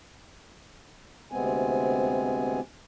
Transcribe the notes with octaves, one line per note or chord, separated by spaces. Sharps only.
D2 C3 G#3 B3 C4 G#5